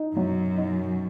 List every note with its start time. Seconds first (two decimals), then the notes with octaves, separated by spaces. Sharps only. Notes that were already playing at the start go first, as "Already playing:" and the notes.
Already playing: D#4
0.16 F#2 F#3
0.57 D#4